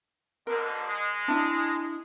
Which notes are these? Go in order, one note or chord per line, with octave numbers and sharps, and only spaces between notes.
G#2 B2 D3 A#4
G#3
D4 E4